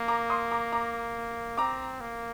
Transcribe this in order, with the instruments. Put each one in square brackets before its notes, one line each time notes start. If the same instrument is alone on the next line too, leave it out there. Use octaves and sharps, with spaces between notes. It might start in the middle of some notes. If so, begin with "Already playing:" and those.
Already playing: [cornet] A#3
[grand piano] A#5 D6
C6 D#6
A#5 D6
A#5 D6
[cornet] C4 [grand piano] A#5 D6
[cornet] A#3